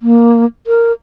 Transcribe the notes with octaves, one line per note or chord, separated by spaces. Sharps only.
A#3
A#4